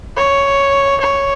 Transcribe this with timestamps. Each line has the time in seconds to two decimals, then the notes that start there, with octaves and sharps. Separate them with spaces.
0.17 C#5
1.00 C#5